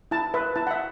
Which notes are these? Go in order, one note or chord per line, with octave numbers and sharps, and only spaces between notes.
E4 A5
B4 E5
E4 A5
F#5
E5